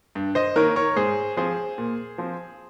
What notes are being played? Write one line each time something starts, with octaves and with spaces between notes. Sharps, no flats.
G2
C5 D#5
D#3 A#3 A#4 C#5
A#4 C#5
G#2 G#4 C5
F3 C4 G#4 C5
A#2
F3 C4